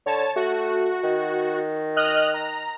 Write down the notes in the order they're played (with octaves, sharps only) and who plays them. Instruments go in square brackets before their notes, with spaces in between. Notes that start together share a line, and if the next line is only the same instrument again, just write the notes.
[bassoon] D3 [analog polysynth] C#5 A5
[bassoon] A3 [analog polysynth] F#4
[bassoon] D#3
[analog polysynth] D#5 F6 F#6
A#5